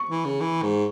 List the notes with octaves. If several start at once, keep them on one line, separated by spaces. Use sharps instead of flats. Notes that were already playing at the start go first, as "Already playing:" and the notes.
Already playing: C#6
E3
C#3
E3
G#2